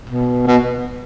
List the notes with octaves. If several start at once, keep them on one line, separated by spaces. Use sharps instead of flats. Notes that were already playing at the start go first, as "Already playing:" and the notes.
B2
B2